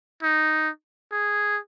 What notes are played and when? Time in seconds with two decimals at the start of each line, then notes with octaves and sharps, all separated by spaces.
0.23 D#4
1.12 G#4